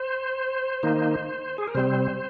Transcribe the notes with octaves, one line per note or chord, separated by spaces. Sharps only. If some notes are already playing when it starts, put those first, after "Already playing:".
Already playing: C5
D#3 A#3 D#4
G#4
A#4
C3 G3 C4 C5